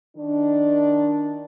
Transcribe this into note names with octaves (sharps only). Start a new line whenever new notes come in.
D#3 D4